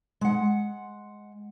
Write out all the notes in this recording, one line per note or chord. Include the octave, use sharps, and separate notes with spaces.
G#3 F#5